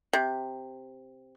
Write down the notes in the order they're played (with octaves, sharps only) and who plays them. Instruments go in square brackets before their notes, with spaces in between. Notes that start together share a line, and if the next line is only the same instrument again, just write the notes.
[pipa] C3